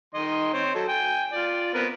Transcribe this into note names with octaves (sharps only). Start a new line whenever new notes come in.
D#3 D#5 C6
C4 C5 C#5
F#3 A4
G5 G#5
F4 D5
B3 C4 A#4